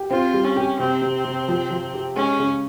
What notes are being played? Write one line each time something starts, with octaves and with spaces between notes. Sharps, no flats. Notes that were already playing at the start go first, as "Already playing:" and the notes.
Already playing: G4
C4 F4
G3
C#4
G4
C3 C4
C3
C3
F3
F3
G4
G#3 C#4
C#3